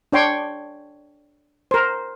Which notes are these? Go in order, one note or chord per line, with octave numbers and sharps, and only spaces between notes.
D4 C#5 G5 C6
A#4 C5